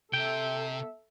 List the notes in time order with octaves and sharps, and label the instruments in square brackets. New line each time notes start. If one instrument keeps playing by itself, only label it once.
[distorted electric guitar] C3 [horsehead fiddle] A4 E5 [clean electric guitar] G5